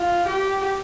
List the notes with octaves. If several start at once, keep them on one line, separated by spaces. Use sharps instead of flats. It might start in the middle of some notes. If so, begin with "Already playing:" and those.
Already playing: F4
G4